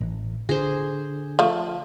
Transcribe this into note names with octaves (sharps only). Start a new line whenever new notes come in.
A1
D3 G#4 C5
F3 A3